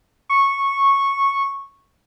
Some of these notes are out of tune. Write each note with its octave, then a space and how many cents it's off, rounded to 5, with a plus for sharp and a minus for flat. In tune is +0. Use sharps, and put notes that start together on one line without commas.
C#6 -10